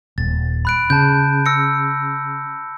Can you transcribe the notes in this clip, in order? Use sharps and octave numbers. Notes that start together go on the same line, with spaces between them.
D#1 A6
B5 F#6 D7
C#3 A5 G6
E6 A#6 C#7